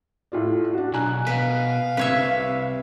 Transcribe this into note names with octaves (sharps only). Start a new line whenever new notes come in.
A2 F4 D5
D4 F#4
B1 G#5 A#5 F#6
B2 B4 F5
C2 C3 B4 C#5 E5